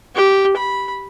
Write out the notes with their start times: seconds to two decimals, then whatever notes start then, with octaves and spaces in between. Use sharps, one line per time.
0.16 G4
0.57 B5